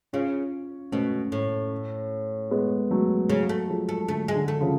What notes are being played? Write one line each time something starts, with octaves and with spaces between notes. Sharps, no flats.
C#3 C#4 F4
B2 A3 C#4
A2
G#3 B3
F#3 A3
C#3 F#3 A3
A3
F3 G#3
A3
D3 A3
G#3
D3
A3
C#3 F3